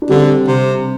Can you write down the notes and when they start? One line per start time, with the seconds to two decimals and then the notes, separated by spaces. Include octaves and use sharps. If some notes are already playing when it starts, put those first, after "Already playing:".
0.02 D4
0.09 D3 G3 C4
0.48 C3